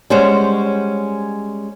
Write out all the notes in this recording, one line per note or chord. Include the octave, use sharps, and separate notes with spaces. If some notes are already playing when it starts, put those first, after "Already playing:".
G3 G#3 C#4 C5 C#5 F#5